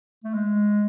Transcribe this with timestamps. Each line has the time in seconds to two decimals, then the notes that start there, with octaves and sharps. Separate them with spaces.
0.24 A3
0.33 G#3